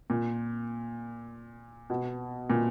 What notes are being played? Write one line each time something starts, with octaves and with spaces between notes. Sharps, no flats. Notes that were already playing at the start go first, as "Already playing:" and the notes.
A#2
B2
A#2